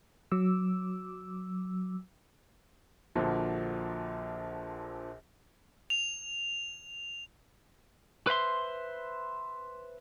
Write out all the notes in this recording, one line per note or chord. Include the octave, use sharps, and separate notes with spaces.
F#3 D6 E6
A#1 A#2 D3 F3 F#4 A5
F7
B4 C5 E5 C6